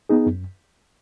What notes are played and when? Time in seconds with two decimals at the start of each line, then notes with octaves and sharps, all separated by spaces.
0.09 B3 D#4 G#4
0.26 F#2